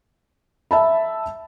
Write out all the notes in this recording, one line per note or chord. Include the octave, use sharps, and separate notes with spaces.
E5 A5 B5